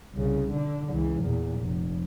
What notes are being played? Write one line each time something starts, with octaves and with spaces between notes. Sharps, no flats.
C2 C#3
D3 D4
C#2 E3
E2 A#2
F1